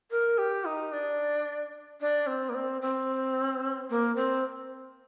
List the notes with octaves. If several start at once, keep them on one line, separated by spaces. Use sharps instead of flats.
A#4
G4
D#4
D4
D4
C4
A#3
C4
C4
A#3
C4